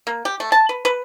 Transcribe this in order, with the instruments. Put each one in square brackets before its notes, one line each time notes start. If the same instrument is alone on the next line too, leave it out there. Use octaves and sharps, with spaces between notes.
[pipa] A#3
G4
A3
A5
B4
B4